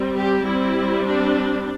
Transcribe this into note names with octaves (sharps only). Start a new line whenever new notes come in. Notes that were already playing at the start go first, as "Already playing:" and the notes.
Already playing: G3 C4
G4
G3 C4 E4
D4